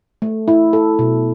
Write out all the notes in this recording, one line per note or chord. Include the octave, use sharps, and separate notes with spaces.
A3
E4
A4
B2